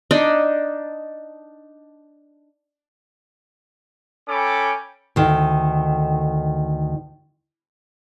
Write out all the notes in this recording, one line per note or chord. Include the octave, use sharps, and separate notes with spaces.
D4 D#4 D#5
C#4 A4 G5 B5 D6
D2 D#3